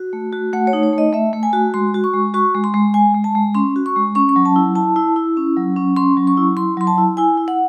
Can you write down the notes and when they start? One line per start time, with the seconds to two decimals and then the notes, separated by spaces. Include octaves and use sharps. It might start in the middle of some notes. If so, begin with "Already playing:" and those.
Already playing: F#4
0.13 A3
0.33 F#4
0.53 A3 F#5
0.67 C#5
0.73 D#4
0.83 C#5
0.93 A3 D#5
1.13 A3 E5
1.33 A3
1.43 G#5
1.53 F#4
1.74 G#3 C6
1.94 F#4
2.04 C#6
2.14 G#3
2.34 F#4 C#6
2.55 G#3
2.64 C6
2.74 G#3
2.94 G#3 G#5
3.14 G#3
3.24 A5
3.35 G#3
3.55 C#4 C6
3.76 F#4
3.86 C#6
3.96 G#3
4.15 C#4 C#6
4.29 C#6
4.36 F#3
4.46 A5
4.56 E4
4.76 E4 A5
4.96 E4
5.16 E4
5.37 C#4
5.56 F#3
5.77 C#4
5.96 C#4 C6
6.17 F#3
6.27 C#6
6.37 E4
6.57 E4 C6
6.77 F#3 C6
6.87 A5
6.98 E4
7.17 E4 G#5
7.38 E4
7.48 F#5